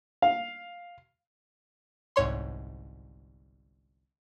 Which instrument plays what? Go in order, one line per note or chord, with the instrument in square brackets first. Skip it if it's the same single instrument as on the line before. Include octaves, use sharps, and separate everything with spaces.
[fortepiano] F5
[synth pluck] G1 C2 G#2 C#5 C6